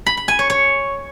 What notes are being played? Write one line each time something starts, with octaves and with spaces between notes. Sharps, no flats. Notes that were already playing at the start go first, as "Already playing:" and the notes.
B5
B5
G#5
C#5
C#5